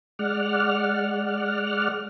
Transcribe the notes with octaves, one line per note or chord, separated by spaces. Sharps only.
G#3 D5 F#5 F6